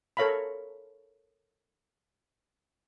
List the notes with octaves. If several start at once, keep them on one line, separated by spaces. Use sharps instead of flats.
A4 A#4 C#5 F5 A#5 B5